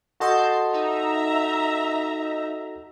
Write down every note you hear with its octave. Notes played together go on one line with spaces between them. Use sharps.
F#4 A4 D#5 A5 C6 G6
D#4 E5 A#5